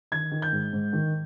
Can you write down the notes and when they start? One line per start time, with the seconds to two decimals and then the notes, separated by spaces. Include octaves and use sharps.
0.12 D#3 G#6
0.31 D#3
0.42 G6
0.52 G#2
0.73 G#2
0.93 D#3